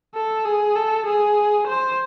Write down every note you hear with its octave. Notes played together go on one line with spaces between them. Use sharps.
A4
G#4
A4
G#4
C5